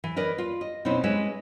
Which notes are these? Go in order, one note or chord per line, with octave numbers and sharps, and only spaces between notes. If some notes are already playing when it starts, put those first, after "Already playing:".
E3
A#4 B4 D5 D#5
F4
D#5
B2 C4 C#4 D#4 E4
G#3 C#4 B4 E5